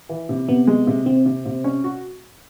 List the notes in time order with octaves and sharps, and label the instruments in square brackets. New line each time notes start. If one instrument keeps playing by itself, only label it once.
[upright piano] E3
C3
[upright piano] C3 [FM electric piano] B3
[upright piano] G#3
C3
[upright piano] C3 [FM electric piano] C4
[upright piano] C3
C3
C#4
F#4